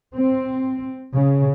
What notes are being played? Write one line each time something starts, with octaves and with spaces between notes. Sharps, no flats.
C4
C#3